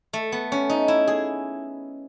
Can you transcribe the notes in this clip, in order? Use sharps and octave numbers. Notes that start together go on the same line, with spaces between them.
A3
B3
C#4
D#4
E4
G#4